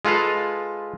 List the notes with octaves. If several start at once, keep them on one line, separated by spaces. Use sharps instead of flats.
G#3 F4 A4 B4 F5